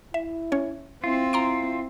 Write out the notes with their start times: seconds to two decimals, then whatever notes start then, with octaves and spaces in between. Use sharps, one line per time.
0.14 E4 E5
0.52 C#4 C#5
1.04 C4 E4 F4
1.33 E4 A#5 C6 D7